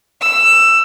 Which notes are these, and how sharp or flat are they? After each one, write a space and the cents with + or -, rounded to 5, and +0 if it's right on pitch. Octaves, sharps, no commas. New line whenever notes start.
E6 +15